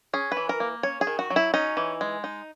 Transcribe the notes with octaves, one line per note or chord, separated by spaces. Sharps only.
C#4 G#4
B4
E3
A#4
A#3
C#4 C#5
G#4
D#3
F#4
F#3
E4
C#4 D#4
E3
G#3
D#4